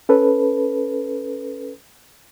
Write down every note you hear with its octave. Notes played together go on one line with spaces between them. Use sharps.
C#4 A4 B4